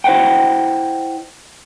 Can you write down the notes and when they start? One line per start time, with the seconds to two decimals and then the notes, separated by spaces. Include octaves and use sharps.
0.04 E4 C5 D#5 F#5 G5